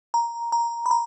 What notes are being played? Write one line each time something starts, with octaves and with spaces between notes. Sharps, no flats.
A#5
A#5
B5
A#5